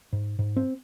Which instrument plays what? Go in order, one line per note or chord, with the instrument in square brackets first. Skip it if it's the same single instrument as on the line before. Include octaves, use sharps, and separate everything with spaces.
[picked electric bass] G#2
G#2
C4